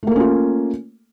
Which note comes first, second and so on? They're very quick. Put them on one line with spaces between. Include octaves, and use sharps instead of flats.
A3 A#3 A4 C#4 F4